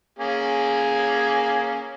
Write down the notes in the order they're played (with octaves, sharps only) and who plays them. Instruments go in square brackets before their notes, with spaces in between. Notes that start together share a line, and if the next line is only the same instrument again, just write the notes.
[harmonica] A#3 C#4 G#4